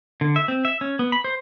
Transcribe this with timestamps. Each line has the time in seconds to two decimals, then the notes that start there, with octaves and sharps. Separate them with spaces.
0.21 D3
0.36 E5
0.48 C4
0.65 E5
0.81 C#4
0.99 B3
1.12 B5
1.24 C5